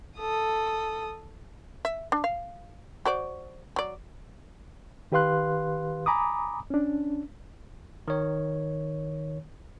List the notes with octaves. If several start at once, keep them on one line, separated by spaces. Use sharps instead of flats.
A4 D#6
E5
D4
F5
F#4 C5 D5
F#3 D5
D#3 G4 B4 F5 C6 F#6
G#5 A#5 B5 D6 D#6
C#4 D4
D#3 C#5